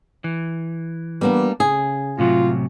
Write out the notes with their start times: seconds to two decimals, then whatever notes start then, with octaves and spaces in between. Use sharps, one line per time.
0.24 E3
1.21 G3 A#3 B3 D4
1.60 C#3 G#4
2.19 A2 C3 F#3 F4